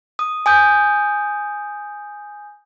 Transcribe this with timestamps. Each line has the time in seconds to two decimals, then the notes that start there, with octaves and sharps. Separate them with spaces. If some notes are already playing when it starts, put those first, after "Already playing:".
0.19 D#6
0.46 G#5 D#6 G6